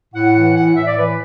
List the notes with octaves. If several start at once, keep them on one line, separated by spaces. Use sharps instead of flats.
A2 F#5
E3 F#5
A2 F#5
A2 E5
D5
E3 B4